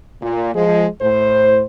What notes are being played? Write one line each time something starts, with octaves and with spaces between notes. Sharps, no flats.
A#2
F3 G#3
A2 C5